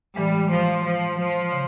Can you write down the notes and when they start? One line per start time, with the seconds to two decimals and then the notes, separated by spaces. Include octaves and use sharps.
0.16 A2 E3 G3 G#3
0.51 F3
0.85 F3
1.19 F3
1.52 C#3